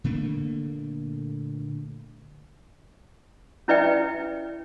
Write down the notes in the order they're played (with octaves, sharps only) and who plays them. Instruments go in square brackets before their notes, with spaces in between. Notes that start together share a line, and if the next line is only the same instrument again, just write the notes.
[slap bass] A#2 D3 A3 A#3
[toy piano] C#4 E4 B4 D5 E5 G5